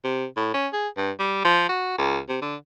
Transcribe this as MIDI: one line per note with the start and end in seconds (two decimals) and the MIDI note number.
0.04 0.26 48
0.37 0.52 45
0.54 0.68 61
0.73 0.88 68
0.97 1.11 43
1.19 1.43 55
1.45 1.64 53
1.69 1.97 66
1.98 2.19 37
2.29 2.38 48
2.42 2.56 50